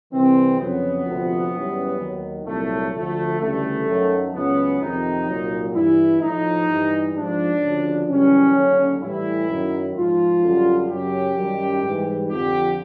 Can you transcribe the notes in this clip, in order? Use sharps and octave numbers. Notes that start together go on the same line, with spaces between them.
C2 C3 E3 C4
F2 C#3 F#3 B3
D2 C3 F3
F#2 C#3 E3 G3
D#2 D#3 F#3
C2 A#2 F#3 A3
D2 D3 F3 A3
D2 C#3 E3 G3 A3
F#2 D#3 F#3
C#2 C#3 F#3 B3
F2 C3 D#3 D#4
C2 A#2 F#3
G2 E3 G3 E4
A2 F3 D#4
G2 E3 G3
G#2 F3 D4
D2 C#3 F3
F#2 C#3 E3 G3 C#4
D#2 D3 F#3
A2 E3 G3 E4
F#2 D#3 F#3
G#2 F3 F4
F#2 D3 G3
F#2 C#3 F#3 G4
F#2 D#3 G3
G#2 E3 G3
F2 D3 F3 G4